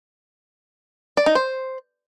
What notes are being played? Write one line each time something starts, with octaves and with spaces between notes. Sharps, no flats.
D5
D#4
C5